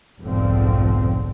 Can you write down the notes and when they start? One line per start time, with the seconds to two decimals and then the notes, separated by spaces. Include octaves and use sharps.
0.21 F1 B1 G#2 D3 F3 C4